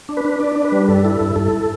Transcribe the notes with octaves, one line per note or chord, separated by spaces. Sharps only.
D4
B4
D4
D4 D5
D4
B4
G3
G2 A4
E4
G2
G2 A4